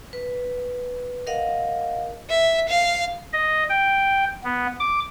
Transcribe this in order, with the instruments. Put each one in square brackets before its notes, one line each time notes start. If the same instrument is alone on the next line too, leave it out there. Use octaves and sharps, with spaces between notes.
[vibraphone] B4
A#4 D#5 F5 F#5
[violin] E5
F5
[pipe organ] D#5
G5
B3
D6